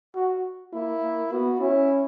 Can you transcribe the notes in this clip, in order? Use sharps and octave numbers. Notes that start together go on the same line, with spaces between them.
F#4
A#3 E4
A#3
B3 F#4
C#4 E4